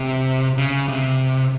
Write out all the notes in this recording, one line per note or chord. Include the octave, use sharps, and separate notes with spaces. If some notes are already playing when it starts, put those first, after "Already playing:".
Already playing: C3
C#3
C3